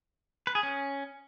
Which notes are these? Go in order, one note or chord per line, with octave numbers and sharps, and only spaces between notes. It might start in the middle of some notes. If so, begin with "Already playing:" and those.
B4
G#4
C#4